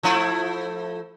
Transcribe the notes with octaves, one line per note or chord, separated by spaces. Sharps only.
F3 A3 E4